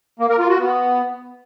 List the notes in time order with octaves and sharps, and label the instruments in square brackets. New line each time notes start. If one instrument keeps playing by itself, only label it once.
[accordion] A#3
A#4
F4
F#4
B3